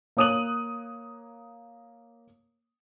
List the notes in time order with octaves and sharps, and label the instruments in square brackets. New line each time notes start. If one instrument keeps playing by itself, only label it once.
[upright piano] A#3 C#5 D#6 F#6 D#7 F#7